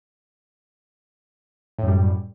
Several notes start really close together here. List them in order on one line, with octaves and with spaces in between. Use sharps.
A2 F#2 G3